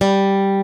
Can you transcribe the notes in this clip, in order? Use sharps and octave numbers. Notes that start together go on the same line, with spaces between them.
G3